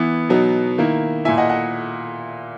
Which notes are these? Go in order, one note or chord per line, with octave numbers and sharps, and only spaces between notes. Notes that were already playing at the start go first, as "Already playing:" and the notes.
Already playing: E3 B3 E4
B2 F#3 B3 D#4
D#3 A#3 E4
A#2 A#3 E4 E5 G#5
D#5 F#5
D#5 F#5